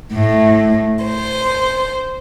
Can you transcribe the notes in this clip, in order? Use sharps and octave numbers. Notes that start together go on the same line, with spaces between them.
A2
C5